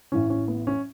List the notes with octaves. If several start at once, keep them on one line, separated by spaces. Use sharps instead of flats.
A1 A2 E3 C#4
C#4
B3
C#4